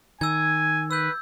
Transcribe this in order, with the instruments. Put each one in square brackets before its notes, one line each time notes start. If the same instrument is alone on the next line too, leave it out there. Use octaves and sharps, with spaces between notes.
[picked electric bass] D#3 [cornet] G#5 [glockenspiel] E6 G#6
[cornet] B4 [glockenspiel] E6 G6